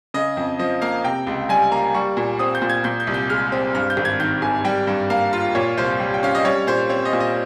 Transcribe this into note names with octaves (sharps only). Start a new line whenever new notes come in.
C#3 D#5
F2
F3 D#5
A#3 F5
C3 G5
C#2
G3 G#5
A#3 A#5
G3 C#6
A#2
C4 D#6
G6
A#2
G#6
A#2 G6
G6
C2
G6
G#3 F6
C4
G2 F6
G6
G#1
G#6
D#3 G6
G#1 G#5
G3 G5
G2
A#3 F5
F4
A#2 C#5
C2 C5
G3
G5
C#4 F5
D#5
G3 C#5
A#2 C5
C4 C#5
D#5
A#2
D#5